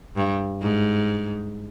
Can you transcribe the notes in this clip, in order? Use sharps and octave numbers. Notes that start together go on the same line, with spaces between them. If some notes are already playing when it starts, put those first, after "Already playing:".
G2
G#2